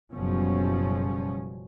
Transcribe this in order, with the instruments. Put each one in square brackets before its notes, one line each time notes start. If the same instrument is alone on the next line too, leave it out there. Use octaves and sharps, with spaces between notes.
[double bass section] F#1 F#2 B2 F3 G3 C#4